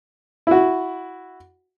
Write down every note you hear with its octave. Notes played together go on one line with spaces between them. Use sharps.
E4 F#4